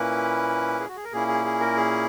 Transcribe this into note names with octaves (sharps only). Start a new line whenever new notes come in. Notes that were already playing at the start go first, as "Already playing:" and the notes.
Already playing: A#2 A#3 C#4 E4 B4
G#4
F#4
G#4
A#4
A#2 A#3 C#4 E4 G#4
G#4
G#4
A#4
G#4